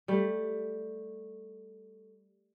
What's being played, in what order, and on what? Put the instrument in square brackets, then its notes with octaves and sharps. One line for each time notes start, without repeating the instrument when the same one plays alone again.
[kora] G3 A3